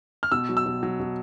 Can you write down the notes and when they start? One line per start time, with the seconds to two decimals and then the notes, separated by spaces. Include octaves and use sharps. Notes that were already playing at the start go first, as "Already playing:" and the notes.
0.23 F6
0.32 B2 E6
0.49 F#3
0.57 E6
0.66 B2
0.83 F#3
1.00 B2